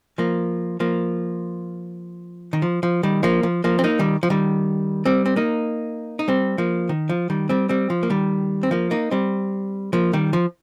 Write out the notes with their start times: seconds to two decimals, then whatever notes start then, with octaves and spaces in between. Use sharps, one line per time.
0.18 F3 A#3
0.80 F3 A#3
2.53 D#3
2.62 F3
2.83 F3
3.03 D#3 G3
3.23 F3 A#3
3.43 F3
3.64 F3 A#3
3.79 C4
3.84 A#3 D#4
3.99 D#3 G3
4.23 F3
4.30 D#3 G3
5.05 G3 C4
5.26 C4
5.36 A#3 D#4
6.19 D#4
6.28 G3 C4
6.58 F3 A#3
6.89 D#3
7.09 F3
7.30 D#3 G3
7.49 G3 C4
7.69 G3 C4
7.90 F3
8.03 A#3
8.10 D#3 G3
8.63 C4
8.71 F3 A#3
8.91 A#3 D#4
9.11 G3 C4
9.93 F3 A#3
10.13 D#3 G3
10.33 F3